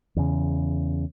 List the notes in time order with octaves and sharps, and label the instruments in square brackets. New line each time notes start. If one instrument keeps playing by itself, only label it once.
[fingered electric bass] E2 C#3